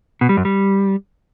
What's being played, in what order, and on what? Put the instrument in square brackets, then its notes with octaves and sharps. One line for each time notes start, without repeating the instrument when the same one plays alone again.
[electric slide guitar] B2
G3
F#2
G3